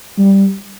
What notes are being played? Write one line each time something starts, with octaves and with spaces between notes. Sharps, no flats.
G3